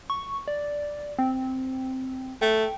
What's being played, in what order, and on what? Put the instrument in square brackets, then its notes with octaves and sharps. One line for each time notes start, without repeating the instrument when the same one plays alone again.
[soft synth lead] C#6
D5
C4
[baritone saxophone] A3 [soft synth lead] G5